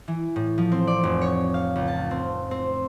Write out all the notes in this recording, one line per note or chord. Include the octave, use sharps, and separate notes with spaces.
E3
A2
F3
C4
D5
F1
C#5
F5
C#2
A5
C4
C4